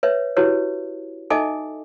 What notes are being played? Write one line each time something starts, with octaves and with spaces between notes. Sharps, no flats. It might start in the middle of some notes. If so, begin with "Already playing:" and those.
B4 C#5 E5
E4 F#4 G4 B4 C#5
D#4 A4 D#5 E5 G#5 D6